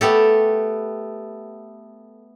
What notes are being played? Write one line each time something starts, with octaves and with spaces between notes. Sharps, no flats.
A3 B3 G4 A4